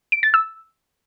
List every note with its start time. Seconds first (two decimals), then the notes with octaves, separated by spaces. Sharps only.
0.12 D7
0.23 A6
0.34 E6